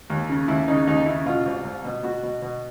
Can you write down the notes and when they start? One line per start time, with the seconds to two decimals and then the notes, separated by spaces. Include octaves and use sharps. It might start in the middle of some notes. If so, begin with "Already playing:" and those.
0.10 D#2
0.30 C#3
0.48 D#2 E4
0.68 C#3 D#4
0.87 D#2 D#4
1.06 C#3 E4
1.26 B2 F4
1.46 C2
1.64 C2
1.85 B2
2.03 B2 F#4
2.23 B2
2.42 B2